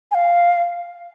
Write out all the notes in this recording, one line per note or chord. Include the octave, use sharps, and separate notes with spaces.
G#5
F5